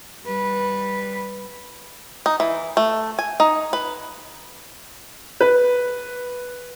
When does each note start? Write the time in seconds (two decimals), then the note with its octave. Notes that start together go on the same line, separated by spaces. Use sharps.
0.24 G3 B4
2.26 D#4
2.40 E3
2.77 A3
3.19 G#5
3.40 D#4
3.73 B4
5.41 B4